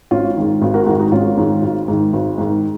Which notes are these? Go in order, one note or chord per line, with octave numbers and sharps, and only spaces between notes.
G#1 C#4 F4
G#2 D#3
G#1
F#4 A#4
G#2 D#3 F#4 A#4
D#4 F#4
G#1 C#4 F4
G#2 D#3
G#1
G#2 D#3
G#1
G#2 D#3